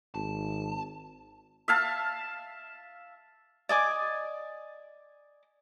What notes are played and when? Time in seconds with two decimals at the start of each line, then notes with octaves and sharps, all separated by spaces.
0.15 G#1 A5
1.68 E5 F5 A5
3.69 D5 D#5 G#5 D6